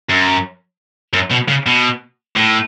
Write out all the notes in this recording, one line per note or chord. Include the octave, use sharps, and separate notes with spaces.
F#2
F#2
B2
C#3
B2
A2